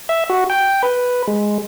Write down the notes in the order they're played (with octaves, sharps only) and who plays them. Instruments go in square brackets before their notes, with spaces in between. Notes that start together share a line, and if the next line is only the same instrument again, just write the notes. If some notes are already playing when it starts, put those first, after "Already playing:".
[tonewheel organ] E5
F#4
G5
B4
G#3